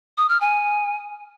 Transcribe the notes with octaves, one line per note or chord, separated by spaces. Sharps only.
D#6
F6
G#5